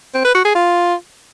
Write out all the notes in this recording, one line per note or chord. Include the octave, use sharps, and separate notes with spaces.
C4
B4
F#4
G#4
F4